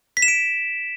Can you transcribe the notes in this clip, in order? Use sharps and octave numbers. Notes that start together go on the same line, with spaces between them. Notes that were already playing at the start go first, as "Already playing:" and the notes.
B6
E7
D7